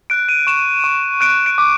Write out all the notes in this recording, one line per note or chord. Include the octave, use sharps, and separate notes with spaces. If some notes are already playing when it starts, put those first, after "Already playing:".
F#6 D7
D#7
C#6 E7
C#6
F#6 D7
D7
D6